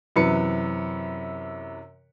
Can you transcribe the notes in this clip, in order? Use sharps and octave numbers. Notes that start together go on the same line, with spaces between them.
F#2 C3 E3 B4 C#7